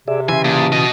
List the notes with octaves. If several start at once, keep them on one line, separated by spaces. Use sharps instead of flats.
C3 G#4 D5 E5
C#3 E3 E5 G#5 C6
A#2 A5 D#6
B2 F#4 D#5